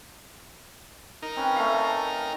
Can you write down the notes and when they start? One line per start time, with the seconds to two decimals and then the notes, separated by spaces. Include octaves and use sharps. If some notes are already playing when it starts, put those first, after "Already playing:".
1.22 D#4 A#4
1.36 C4 C#4 B4
1.56 A3 F5
1.72 A5